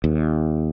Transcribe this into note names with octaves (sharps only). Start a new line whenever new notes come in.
D#2